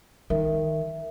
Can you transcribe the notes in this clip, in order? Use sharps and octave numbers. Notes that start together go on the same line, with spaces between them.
D#3 A#4 E5